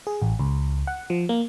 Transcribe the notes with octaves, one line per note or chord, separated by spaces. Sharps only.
G#4
A1
C#2
F#5
F3
A#3